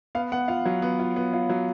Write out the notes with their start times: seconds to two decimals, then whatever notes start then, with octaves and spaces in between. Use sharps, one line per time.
0.15 B3 F5
0.32 B3 F#5
0.48 F4 F5
0.66 F#3
0.82 B3
0.99 F4
1.16 B3
1.33 F4
1.50 F#3